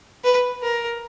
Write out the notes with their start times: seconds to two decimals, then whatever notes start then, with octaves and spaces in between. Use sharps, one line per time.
0.24 B4
0.63 A#4